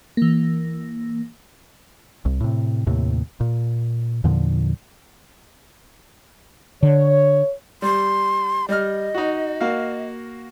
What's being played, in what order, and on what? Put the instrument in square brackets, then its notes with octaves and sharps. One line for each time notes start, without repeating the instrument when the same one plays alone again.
[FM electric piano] E3 A#3
[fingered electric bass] C2
A2 C3
D#2 A2 C3
A#2
E2 A#2 D3 F3
[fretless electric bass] D3 [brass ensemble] C#5
[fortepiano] G3 [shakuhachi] C6
[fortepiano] G3 F6 [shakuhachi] D#5
[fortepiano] D#4 F#4
A#3 F#4 F5